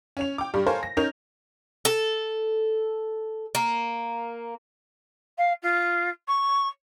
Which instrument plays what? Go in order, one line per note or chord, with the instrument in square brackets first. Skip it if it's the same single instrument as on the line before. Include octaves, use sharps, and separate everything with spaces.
[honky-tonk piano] C#4 C#5 F7
G5 D6
G2 G3 G4
A4 A#4 C5 C#5 F5 G#5
A#6
C#4 D#4 A#4 C#5 G6 F7
[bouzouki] A4
A#3
[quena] F5
F4
C#6